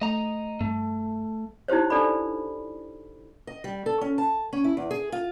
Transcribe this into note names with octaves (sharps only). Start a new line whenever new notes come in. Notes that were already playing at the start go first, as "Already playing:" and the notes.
A3 D#5 A#5
G2 A3
D#4 E4 G4 C5 C#5
D4 A4 D5 B5
D#5
G3
A4
C#4
A5
C#4
E4
E2
G#4
F4